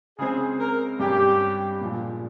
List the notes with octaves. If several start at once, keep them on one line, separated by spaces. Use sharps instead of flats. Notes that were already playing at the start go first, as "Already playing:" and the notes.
C#3 G#3 C4 G#4
A#4
G2 G3 C#4 G4
A#2 F3 G#3